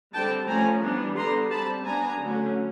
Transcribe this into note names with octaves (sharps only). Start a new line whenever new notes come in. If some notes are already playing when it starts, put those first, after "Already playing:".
D3 G3 C4 G5 A5
F3 A3 C#4 G#5 A#5
E3 G3 B3 D4
D3 G3 B3 A#5 C6
G3 C4 A5 B5
G3 B3 D4 G#5 A#5
D3 F#3 A3 C#4